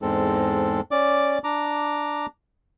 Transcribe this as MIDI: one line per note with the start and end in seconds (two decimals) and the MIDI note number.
0.02 0.81 40
0.02 0.81 44
0.02 0.81 56
0.02 0.81 60
0.02 0.81 69
0.91 1.38 61
0.91 1.38 74
0.91 1.38 86
1.44 2.26 62
1.44 2.26 82
1.44 2.26 86